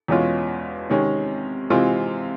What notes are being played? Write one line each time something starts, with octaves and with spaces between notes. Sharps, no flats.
E2 B2 G#3 C#4 F4
C3 D#3 G#3 C#4
C3 E3 G#3 C4 F4